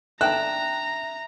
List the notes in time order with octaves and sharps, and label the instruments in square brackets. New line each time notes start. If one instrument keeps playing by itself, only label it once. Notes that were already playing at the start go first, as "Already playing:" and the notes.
[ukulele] D4 G5 A5 [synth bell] E5 [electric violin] A#5 [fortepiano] F#6